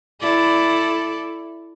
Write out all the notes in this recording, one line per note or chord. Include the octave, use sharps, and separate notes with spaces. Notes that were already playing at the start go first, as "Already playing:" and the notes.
E4 A4 D5